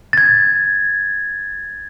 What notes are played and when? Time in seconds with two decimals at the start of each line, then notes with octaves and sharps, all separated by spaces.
0.13 G#6 A6